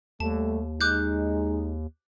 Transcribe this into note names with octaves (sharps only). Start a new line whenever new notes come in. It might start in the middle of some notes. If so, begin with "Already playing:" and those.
D#2 G3 A3 A5
G#3 D#4 D6 F#6 G6